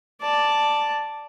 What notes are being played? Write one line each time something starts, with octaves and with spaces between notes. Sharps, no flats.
D5 A5